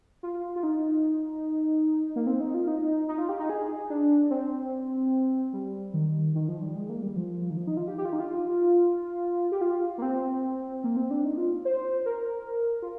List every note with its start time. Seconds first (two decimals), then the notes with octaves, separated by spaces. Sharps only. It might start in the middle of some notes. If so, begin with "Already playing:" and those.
0.23 F4
0.56 F4
0.63 D#4
2.16 A#3
2.27 C4
2.40 D#4
2.54 F4
2.67 D#4
3.08 D#4
3.18 F4
3.29 G4
3.39 D#4
3.50 G#4
3.90 D4
4.31 C4
5.53 G3
5.94 D#3
6.35 D#3
6.48 F3
6.62 G3
6.76 G#3
6.89 A#3
7.02 G3
7.16 F3
7.50 D#3
7.57 F3
7.67 D#4
7.77 F4
7.88 G4
7.98 G4
8.05 F4
8.13 D#4
8.20 F4
9.52 G4
9.61 F4
9.98 A#3
10.02 C4
10.84 A#3
10.97 C4
11.11 D4
11.24 D#4
11.38 F4
11.65 C5
12.06 A#4
12.82 F4